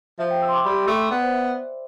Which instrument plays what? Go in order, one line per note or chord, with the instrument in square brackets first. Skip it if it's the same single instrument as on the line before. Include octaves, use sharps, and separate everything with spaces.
[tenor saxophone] F3 [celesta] E5
[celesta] G5
E6
C6
D6
[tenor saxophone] G3 [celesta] B5
[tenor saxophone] A3 [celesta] E5
[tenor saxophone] B3 [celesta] D5
[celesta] C5
E5